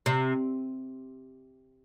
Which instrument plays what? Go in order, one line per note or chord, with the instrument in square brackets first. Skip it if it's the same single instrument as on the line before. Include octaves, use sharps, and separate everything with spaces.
[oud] C3